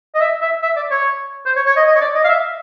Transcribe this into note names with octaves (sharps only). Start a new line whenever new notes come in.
D#5
E5
E5
E5
D5
C#5
C5
C#5
C#5
D#5
D#5
C#5
D5
D#5
F5
E5